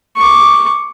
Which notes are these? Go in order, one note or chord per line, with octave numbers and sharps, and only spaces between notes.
C#6 D6